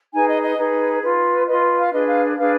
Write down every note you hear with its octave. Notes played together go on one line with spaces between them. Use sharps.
D#4 G#4 B4 G#5
D#5
D#5
D#4 G#4 B4
F4 B4
F4 B4 D#5
F5
D4 G#4 B4 D#5
F5
D4 G#4 B4 F5